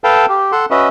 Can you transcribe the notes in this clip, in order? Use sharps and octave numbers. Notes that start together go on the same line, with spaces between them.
A4 B4 F5 G5 A5
G4
A4 F#5 C6
C#4 F#4 B4 D#5 E5